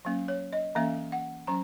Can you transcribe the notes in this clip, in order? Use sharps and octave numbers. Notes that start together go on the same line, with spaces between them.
F#3 A#3 C#4
C#5
D#5
E3 A#3 C#4 E5
F#5
F#3 C#4 A#5